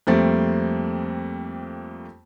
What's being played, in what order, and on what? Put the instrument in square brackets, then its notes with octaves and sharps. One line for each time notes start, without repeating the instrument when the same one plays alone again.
[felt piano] F2 G3 A3 A#3 C4 A6